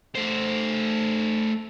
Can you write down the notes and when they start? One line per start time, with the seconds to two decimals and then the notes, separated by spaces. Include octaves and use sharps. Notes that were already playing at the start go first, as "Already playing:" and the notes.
0.15 A3 C5